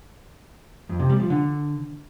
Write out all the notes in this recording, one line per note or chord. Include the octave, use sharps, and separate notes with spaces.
F2
C3
G3
F3
D3